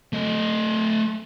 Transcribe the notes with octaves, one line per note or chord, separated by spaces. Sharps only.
A3 D#5